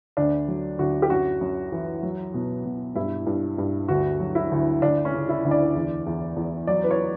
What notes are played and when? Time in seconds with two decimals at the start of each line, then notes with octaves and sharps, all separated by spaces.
0.17 D2 D4
0.48 F#3
0.79 D2 F#4
1.02 G4
1.10 F#2 F#4
1.41 F#2
1.72 E3
2.03 F#3
2.34 B2
2.65 B2
2.95 G2 E4
3.27 G2
3.58 G2
3.88 D2 F#4
4.20 F#3
4.35 E4
4.52 D2
4.82 D2 D4
5.05 C#4
5.14 C#3
5.29 E4
5.45 D2
5.51 D5
5.75 E2
6.06 E2
6.36 E2
6.67 F#3 D5
6.83 B4
6.91 C#5